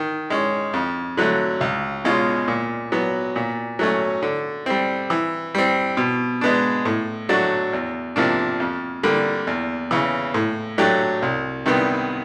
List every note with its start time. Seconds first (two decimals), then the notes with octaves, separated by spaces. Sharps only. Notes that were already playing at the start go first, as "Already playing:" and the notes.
Already playing: D#3
0.30 G#3 C#4
0.73 F2
1.17 D3 F#3 A3
1.61 C#2
2.05 B2 G#3 C#4 F4
2.48 A#2
2.92 F#3 B3
3.36 A#2
3.79 F#3 A3 C#4
4.23 D3
4.66 G3 C4
5.10 E3
5.55 G3 C4
5.97 B2
6.41 G#3 B3 D4
6.86 A2
7.29 F#3 A3 D4 F#4
7.73 E2
8.16 C3 F3 A#3 D4
8.60 F2
9.03 D3 G3 A#3
9.47 E2
9.91 C#3 E3
10.34 A2
10.78 F#3 A3 D4 G4
11.22 C2
11.66 C3 D#3 G3 B3